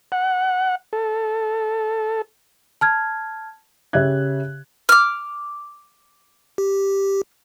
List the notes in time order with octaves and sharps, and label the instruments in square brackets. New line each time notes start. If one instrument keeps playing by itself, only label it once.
[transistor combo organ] F#5
A4
[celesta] A5 F6 G#6
[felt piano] C#3 G4 C#5 E5 F#6 G#6
[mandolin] D6 F6
[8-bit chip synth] G4